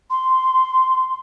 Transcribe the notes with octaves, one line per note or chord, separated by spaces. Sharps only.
C6